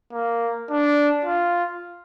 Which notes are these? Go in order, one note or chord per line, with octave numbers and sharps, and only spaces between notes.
A#3
D4
F4